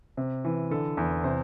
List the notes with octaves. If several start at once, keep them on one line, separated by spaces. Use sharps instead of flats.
C3
E3
D3 A4
E2
C3 C5